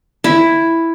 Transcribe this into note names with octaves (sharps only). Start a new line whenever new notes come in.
E4